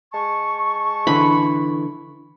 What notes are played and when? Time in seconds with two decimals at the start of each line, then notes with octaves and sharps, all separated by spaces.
0.13 G#3 A5 C#6
1.07 D3 E3 B5